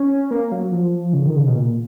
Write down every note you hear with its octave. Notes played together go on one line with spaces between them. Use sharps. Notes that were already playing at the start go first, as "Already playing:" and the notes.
Already playing: C#4
A#3
F#3
F3
C#3
D#3
C#3
B2
A#2